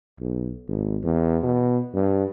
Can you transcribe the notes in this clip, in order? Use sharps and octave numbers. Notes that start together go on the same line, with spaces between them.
B1
G#1
E2
B2
G2